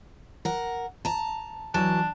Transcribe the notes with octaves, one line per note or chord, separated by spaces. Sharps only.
A#4 F#5
A5 A#5
E3 F#3 D4 A5